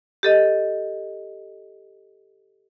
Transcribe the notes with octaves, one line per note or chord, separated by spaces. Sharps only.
G4 A4 D#5